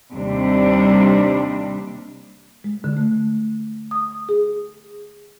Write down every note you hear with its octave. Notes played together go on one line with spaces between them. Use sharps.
D#2 C3 G3 D4
G#3
D3
A3
D#6
G#4